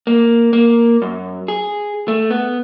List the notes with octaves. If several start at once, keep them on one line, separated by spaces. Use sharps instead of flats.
A#3
A#3
F#2
G#4
A3
B3